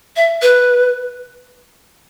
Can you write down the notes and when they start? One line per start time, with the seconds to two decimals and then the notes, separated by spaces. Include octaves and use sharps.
0.16 E5
0.42 B4